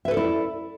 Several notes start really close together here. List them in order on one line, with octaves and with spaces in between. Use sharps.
E5 B4 A4 D5 E4